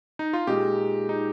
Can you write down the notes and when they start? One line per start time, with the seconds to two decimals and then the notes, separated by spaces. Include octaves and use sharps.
0.19 D#4
0.33 F4
0.47 A#2 G#3 D#4 G4
1.09 D#4